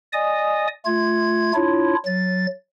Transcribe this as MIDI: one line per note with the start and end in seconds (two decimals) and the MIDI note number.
0.13 0.67 74
0.13 0.67 75
0.13 0.67 80
0.13 0.67 87
0.85 1.52 57
0.85 1.52 65
0.85 1.52 92
1.54 1.94 62
1.54 1.94 64
1.54 1.94 65
1.54 1.94 73
2.06 2.47 54
2.06 2.47 93